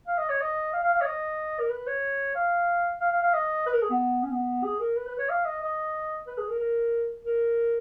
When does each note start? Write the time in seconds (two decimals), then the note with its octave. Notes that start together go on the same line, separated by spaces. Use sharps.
0.07 F5
0.18 D#5
0.30 C#5
0.41 D#5
0.73 F5
0.83 F5
0.93 F5
1.01 C#5
1.05 D#5
1.59 A#4
1.70 B4
1.87 C#5
2.35 F5
3.00 F5
3.12 F5
3.22 F5
3.33 D#5
3.66 B4
3.73 A#4
3.82 G#4
3.90 B3
4.23 C#4
4.31 B3
4.64 G#4
4.80 A#4
4.96 B4
5.07 B4
5.18 C#5
5.29 F5
5.45 D#5
5.62 D#5
6.27 B4
6.38 G#4
6.49 A#4
6.59 A#4
7.25 A#4